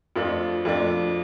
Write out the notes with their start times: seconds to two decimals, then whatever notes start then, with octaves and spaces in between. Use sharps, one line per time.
0.16 F2 F3 A3 D4
0.65 F2 F3 A3 D4